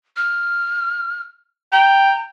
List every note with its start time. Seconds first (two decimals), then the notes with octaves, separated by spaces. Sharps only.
0.17 F6
1.72 G5 A#5